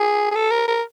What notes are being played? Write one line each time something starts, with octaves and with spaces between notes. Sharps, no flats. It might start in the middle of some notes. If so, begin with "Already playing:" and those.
Already playing: G#4
G#4
A4
A#4
A#4